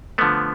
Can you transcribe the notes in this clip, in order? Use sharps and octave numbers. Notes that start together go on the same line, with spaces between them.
D3 F3 A3 B3